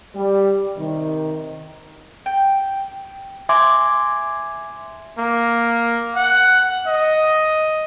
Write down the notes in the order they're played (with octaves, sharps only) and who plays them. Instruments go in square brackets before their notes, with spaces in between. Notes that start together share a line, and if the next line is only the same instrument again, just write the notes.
[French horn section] G3
C3 D#3
[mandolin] G5
[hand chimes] E5 G#5 C6 D6 G#6
[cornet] A#3
F#5
D#5